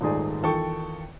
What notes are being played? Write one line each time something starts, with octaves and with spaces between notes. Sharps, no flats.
D#1 G#2 A3 D#4 G#4 D5
E2 D#3 F4 A4 G5 C#6